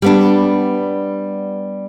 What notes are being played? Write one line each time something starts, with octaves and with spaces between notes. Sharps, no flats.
G3 B3 D4